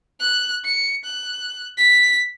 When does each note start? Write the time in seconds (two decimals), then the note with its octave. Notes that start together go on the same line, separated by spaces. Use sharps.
0.20 F#6
0.65 C#7
1.05 F#6
1.78 B6